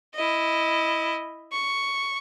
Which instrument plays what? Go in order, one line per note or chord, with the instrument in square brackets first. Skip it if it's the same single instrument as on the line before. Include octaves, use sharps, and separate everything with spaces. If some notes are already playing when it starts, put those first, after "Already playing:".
[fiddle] E4 D#5
C#6